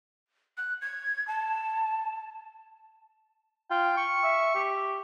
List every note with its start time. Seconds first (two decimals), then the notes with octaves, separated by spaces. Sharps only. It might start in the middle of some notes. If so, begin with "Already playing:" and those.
0.58 F#6
0.82 G#6
1.28 A5
3.70 F4 G5
3.97 C#6
4.23 E5
4.55 G4